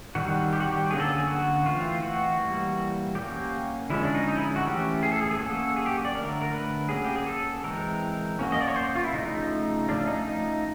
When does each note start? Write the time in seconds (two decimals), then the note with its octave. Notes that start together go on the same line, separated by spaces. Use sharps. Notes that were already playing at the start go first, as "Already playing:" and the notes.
0.15 D#3 G3 C4 F#4
0.53 G4
0.60 F#4
0.68 G4
0.90 D3 F#3 A#3 C#4 G#4
1.00 A4
1.18 G#4
1.27 F#4
1.65 E3 A3 C4 F4
2.03 F#4
2.39 E3 G3 A#3
3.15 F#3 A#3 C#4 G4
3.90 D3 F3 G#3 C#4 E4
4.03 D4
4.15 D#4
4.28 D#4
4.37 E4
4.56 F#4
4.65 E3 A3 C#4 G4
5.03 G#4
5.12 A4
5.21 G#4
5.31 G#4
5.39 F#3 A#3 C#4 A4
5.76 G#4
5.86 G4
6.05 D5
6.14 D3 F#3 A3 A#4
6.42 A#4
6.52 B4
6.89 F#3 A#3 C#4 G#4
7.05 G4
7.16 G#4
7.26 A4
7.63 E3 G#3 C4 A#4
8.39 F#3 A#3 C#4
8.52 D#5
8.61 D5
8.68 C#5
8.76 C5
8.95 F4
9.04 E4
9.13 C#3 F3 A3 D#4
9.88 F3 A3 C#4 D4
10.07 D#4
10.26 D#4